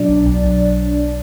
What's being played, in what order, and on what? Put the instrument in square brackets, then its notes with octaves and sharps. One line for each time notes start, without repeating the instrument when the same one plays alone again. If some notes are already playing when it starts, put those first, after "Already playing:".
Already playing: [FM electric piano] B2 F#3 D4 D5
B1
B1
B1